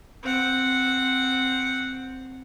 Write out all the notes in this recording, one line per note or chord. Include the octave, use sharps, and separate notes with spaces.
C4 F#5